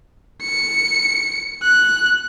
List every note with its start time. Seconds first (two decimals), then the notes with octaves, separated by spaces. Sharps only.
0.43 C#7
1.63 F#6